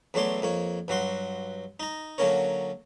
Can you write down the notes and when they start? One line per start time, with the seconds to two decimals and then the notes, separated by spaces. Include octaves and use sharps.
0.14 E2 F#3 A3 C#5 D5 C6
0.42 F2 A#3 C#5
0.88 G2 F#3 F#4 C6
1.80 D#4 A#5
2.18 D3 F#3 A#3 C#4 A#4 C#5